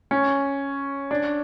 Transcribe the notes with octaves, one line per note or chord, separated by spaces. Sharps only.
C#4
D4